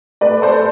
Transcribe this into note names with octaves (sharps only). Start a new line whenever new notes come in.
A3 B4 D5
A4 C5